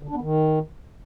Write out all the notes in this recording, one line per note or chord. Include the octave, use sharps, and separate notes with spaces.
D3
D4
B3
D#3